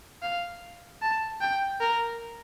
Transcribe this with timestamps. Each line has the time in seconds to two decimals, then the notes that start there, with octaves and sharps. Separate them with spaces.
0.22 F5
1.02 A5
1.41 G5
1.81 A#4